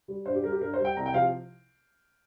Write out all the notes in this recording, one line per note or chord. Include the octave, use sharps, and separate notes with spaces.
G3
G2 C5
G4
G3 A#4
G4
G2 A#4
C5
G3
G5
C2 A#5
G5
C3 F3 F5